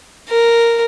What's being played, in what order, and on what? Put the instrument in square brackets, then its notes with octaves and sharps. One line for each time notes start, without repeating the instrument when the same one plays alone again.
[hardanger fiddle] A#4